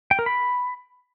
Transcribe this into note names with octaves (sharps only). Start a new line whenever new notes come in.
G5
A#4
B5